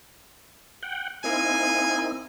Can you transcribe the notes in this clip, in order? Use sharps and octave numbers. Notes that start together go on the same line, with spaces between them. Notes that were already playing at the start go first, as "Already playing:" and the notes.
F#5 G5
A#3 C4 D#4 E4 G#5